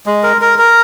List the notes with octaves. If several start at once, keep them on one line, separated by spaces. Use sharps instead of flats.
G#3
A#4
A#4
A#4